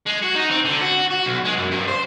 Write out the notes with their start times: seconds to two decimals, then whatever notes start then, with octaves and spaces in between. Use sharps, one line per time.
0.06 G#3
0.22 F#4
0.35 D#4
0.51 C4
0.65 D3
0.81 F#4
1.10 F#4
1.26 B1
1.45 G#3
1.57 F#2
1.71 G2
1.88 C5